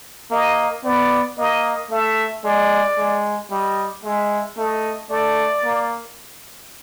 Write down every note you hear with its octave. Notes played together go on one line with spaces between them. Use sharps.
A#3 D#5
B3 D5
A#3 D#5
A3 E5
G#3 D5
G#3
G3 D#5
G#3 E5
A3 D#5
A3 D5
A#3